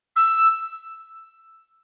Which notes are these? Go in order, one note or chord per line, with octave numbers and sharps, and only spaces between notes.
E6